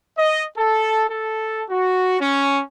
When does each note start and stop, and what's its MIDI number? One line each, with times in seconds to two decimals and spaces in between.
0.16 0.44 75
0.57 1.07 69
1.09 1.61 69
1.69 2.17 66
2.19 2.61 61